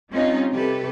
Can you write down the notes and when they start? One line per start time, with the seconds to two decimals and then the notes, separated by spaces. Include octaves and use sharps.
0.10 G3 C4 C#4 D#4 F4 D#5
0.51 C3 G4 A4 B4